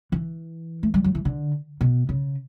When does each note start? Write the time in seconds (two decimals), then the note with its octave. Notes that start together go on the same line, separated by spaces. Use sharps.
0.12 E3
0.83 A3
0.94 G3
1.04 F#3
1.15 E3
1.25 D3
1.81 B2
2.09 C#3